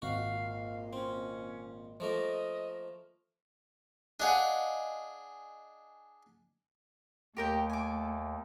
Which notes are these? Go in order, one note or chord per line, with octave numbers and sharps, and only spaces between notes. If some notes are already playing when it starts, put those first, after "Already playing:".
G#1 A#2 F#4 F5
C4 C#4
F3 A3 A#3 D#5
D4 G#4 D#5 F5 F#5
D#2 A3 G4 A#4 G5
G#5 D6